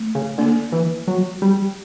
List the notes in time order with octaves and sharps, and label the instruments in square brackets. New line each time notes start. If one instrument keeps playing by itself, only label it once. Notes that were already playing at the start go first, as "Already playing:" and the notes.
Already playing: [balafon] A3
[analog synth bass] C#3
[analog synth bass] D3 [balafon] A#3
[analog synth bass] E3
F#3
G3